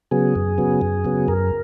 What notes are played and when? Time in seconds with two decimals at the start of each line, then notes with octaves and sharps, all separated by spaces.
0.11 C#3 F#3 B3 G#4
0.36 F#2
0.58 C#3 F#3 B3
0.81 F#2
1.05 C#3 F#3 B3
1.28 F#2 A#4